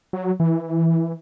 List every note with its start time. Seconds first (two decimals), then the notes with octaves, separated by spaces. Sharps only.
0.13 F#3
0.40 E3